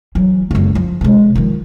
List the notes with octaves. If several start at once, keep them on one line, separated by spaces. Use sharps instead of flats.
E3 F#3
F#1 C#2
F3
B2 G#3
D#3 F3